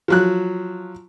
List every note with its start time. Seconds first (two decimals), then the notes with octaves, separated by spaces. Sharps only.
0.08 F3 F#3 F#6